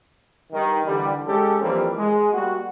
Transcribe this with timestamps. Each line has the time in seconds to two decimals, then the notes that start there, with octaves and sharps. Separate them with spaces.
0.52 G2 D#3
0.85 D3 E3 G3
1.27 G#3 C#4 G4 A4
1.62 F2 E3 G3 A#3 C4
1.97 G#3
2.33 G3 A#3 F#4